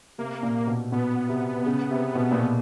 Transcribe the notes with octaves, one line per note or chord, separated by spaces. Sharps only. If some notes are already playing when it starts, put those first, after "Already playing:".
C3 A#3
A#2
B2
B2 B3
C3
C#3
C3
B2
A#2
B2